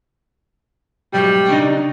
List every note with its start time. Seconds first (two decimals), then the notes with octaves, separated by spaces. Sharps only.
1.13 B1 G#2 F#3 G3
1.48 C#3 D4 D#4